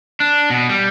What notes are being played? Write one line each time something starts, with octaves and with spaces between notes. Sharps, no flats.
D4
B2
G3